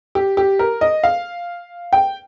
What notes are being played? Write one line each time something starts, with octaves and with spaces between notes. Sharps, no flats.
G4
G4
A#4
D#5
F5
G5